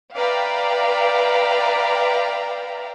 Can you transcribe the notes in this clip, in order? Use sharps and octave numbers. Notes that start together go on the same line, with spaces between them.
B4 D5 E5 F5 G5 A#5